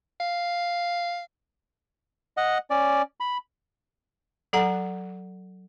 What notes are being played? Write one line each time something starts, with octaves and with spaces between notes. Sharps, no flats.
F5
D#5 F#5
C#4 D5
B5
F#3 A4 F#5 A#5